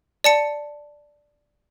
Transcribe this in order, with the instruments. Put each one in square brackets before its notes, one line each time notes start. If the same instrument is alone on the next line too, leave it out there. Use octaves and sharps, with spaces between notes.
[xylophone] D5 A5 C#7